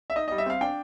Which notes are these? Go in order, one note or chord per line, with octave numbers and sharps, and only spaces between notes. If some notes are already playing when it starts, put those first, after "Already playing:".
E5
D#4 D#5
G3 D#5
E5
C4 F5
D4 G5